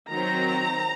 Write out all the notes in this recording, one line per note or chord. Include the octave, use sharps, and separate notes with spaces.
D#3 F#3 C4 A#5